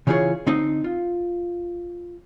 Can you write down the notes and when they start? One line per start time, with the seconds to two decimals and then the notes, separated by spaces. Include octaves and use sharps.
0.07 C#3 E3 C#4 F4 G#4 C#5
0.47 D3 C4 D#4
0.84 F4